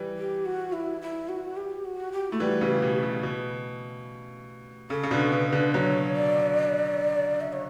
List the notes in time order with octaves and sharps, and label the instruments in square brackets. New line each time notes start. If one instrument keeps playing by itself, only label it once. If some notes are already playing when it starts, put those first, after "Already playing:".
Already playing: [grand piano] E3 G3
[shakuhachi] G4
F#4
E4
E4
F#4
G4
F#4
G4
[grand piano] A3 [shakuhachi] E4
[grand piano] E3 G3 [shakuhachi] F#4
[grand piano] C#3 E3
[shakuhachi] G4
[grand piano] B2
C#3
B2
[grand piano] C#3 [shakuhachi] A4
[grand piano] C#3
B2 D3
[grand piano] C#3 [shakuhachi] B4
[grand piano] B2 D3
[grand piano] D3 F#3 [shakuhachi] C#5
[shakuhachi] D5
E5
C#5